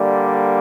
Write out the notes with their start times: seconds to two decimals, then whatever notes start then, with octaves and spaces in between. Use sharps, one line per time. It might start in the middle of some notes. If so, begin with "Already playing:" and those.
Already playing: D3 G3 A#3